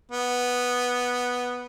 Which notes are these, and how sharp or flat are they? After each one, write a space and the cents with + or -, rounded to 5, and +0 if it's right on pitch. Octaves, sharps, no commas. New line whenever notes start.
B3 -5